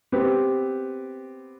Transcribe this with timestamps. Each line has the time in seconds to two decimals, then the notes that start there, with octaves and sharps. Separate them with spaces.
0.12 B3 C4 G4 B4